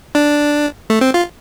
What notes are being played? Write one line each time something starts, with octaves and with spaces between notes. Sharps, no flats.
D4
A3
C4
F4